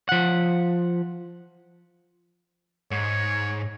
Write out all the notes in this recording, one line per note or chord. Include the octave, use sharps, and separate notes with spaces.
F3 F#5
G#2 C#5